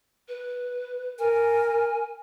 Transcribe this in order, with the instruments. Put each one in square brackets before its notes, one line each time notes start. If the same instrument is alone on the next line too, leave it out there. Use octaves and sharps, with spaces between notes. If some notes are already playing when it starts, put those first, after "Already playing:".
[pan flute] B4
[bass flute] A#4 [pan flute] G#5